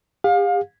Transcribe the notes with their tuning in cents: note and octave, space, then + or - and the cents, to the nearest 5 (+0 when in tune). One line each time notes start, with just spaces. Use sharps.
G4 +45 F5 +30